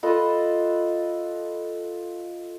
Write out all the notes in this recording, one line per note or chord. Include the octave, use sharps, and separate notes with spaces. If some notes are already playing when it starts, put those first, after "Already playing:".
F4 A4 B4 D#5